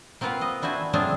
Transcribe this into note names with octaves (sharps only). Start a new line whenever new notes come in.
A#3 C4 F4 B4 F5 F#5
D#5
D4 E4 F#4 C5 G#5
F#3 A3 C4 D4 F4 G#4